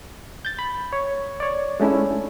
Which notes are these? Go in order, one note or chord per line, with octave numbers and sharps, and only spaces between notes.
G6 A6
B5
C#5
C#5 D5
G#3 A3 C#4 D4 E4